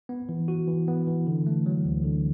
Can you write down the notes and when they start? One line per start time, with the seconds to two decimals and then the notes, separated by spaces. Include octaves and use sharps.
0.09 B3
0.29 E3
0.48 F#4
0.67 E3
0.88 B3
1.07 E3
1.27 D3
1.47 A3
1.66 F#3
1.85 D2
2.04 D3